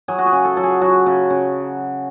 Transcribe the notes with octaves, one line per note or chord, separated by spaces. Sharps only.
F#3 G#4
F#4
G#4
C#3
A4
F#3 A4
G#4
F#3 F#4
C#3
C#3